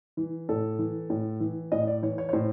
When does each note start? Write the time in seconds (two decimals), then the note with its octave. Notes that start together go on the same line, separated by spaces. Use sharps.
0.17 E3
0.49 A2 A4
0.79 E3
1.10 A2
1.40 E3
1.72 A2 D#5
1.87 D5
2.02 E3 C#5
2.18 C#5
2.29 C#5
2.33 A2 C5